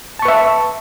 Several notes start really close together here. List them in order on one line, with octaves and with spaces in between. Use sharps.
A5 C#6 B4 E5